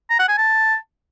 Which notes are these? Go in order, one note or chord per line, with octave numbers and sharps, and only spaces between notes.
A#5
F#5
G#5
A5